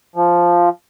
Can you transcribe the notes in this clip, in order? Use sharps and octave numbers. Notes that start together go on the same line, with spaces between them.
F3